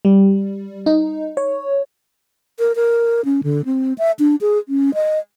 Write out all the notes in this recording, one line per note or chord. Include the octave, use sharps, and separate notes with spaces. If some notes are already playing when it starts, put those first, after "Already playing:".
G3
D#4
C#5
A#4
A#4
C#4
D3
C4
E5
D4
G#4
C#4
D#5